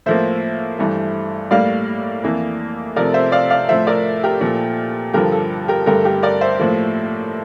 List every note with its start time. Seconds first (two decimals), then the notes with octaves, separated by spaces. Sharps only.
0.06 A2 F3 A#3 C5 E5
0.78 G2 E3 A3
1.51 A2 G3 A#3 D5 F5
2.24 F2 E3 A#3
2.96 C3 F3 A3 A#4 D5
3.14 C5 E5
3.32 D5 F5
3.50 D5 F5
3.69 A2 F3 A3 C5 E5
3.87 A#4 D5
4.24 G4 A#4
4.41 A#2 F3 A3
5.13 G2 D3 F3 G4 A#4
5.32 A4
5.68 G4 A#4
5.86 G2 D3 A3 G4 A#4
6.05 G4 A#4
6.22 A#4 D5
6.41 C5 E5
6.60 A2 F3 A#3